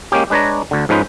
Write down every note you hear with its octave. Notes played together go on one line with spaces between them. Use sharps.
G#3 A#3 C#4 G4
G#3 D4 B4 C#5 D5 A#5
D2 D3
G#2 F3 C#4 D#4 B4 C5